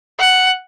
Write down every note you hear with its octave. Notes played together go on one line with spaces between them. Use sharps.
F#5